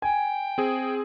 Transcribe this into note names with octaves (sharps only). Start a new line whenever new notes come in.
G5 G#5
C4 G#4